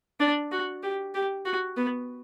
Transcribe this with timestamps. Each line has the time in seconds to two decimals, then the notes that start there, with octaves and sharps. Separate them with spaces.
0.20 D4
0.52 F#4
0.83 G4
1.14 G4
1.46 F#4
1.77 B3